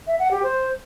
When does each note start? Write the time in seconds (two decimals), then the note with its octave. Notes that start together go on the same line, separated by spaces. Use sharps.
0.07 E5
0.19 F#5
0.31 G4
0.43 C5